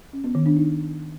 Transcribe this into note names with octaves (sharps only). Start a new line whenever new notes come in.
C#4
B3
D#3
D4
D#4